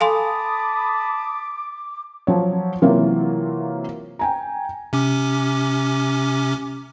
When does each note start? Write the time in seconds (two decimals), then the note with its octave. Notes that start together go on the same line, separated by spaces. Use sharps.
0.01 A4 F5 G#5 A5 B5 C6 D6 D#6
2.27 F3 F#3 C#5
2.82 C3 E3 F#3 A#3 C4 F4
4.19 G5 G#5 A#5
4.93 C3 C#4 D6